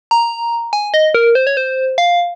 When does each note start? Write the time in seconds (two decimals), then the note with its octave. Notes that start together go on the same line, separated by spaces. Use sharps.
0.11 A#5
0.73 G#5
0.94 D#5
1.14 A#4
1.35 C5
1.47 C#5
1.57 C5
1.98 F5